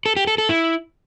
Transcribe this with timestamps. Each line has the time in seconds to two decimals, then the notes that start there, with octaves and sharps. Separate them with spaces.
0.06 A4
0.16 G4
0.27 A4
0.38 A4
0.49 E4